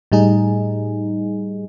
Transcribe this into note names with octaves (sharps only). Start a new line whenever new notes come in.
A2 G3 D#4 G#4